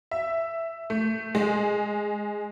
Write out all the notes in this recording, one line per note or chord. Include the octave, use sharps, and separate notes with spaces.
E5
A3
G#3